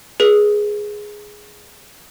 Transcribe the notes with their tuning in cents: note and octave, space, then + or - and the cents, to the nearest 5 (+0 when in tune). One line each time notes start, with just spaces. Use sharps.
G#4 +0 B4 -30